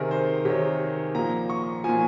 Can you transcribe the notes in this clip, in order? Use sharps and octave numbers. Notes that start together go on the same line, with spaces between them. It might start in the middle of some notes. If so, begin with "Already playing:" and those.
Already playing: C3 D#3 G#4 A#4
C5
C3 D#3 C#5
A#2 F3 A#5
C#6
A#2 F3 G#5